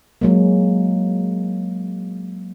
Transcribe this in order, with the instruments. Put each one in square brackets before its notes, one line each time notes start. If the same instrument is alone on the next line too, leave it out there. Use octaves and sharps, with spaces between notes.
[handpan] F#3 G#3 A#3